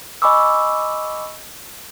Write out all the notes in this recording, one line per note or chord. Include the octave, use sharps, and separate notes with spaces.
D#5 G#5 B5 C#6 D6 E6